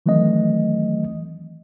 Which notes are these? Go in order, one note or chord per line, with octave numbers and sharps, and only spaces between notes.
D#3 E3 F#3 A3 C4 D#5